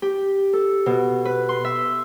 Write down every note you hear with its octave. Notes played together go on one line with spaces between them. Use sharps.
G4
A4
B2
B4
C6
E5